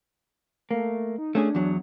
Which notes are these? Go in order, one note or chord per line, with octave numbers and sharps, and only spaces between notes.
A3 A#3
D#4
A3 C#4 D4 G#4
E2 F#3